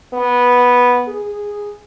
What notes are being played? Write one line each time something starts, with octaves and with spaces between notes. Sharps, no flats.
B3
G#4